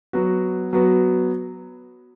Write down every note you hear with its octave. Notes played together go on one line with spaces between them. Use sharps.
F#3 B3 F#4
F#3 B3 F#4